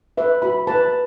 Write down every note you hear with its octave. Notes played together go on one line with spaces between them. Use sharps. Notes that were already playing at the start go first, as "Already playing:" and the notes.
B4 E5
F#4 B5
B4 A5